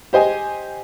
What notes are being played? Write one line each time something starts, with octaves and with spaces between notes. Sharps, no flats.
G4 C5 D#5 G#5